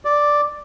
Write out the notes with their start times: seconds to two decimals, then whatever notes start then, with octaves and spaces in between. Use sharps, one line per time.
0.05 D5